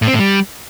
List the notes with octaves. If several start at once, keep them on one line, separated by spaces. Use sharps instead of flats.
A2
C4
A2
G3